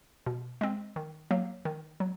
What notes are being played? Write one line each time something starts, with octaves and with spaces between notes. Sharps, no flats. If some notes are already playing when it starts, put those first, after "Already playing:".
B2
G#3 C4
D#3
F#3 A#3
D#3
F#3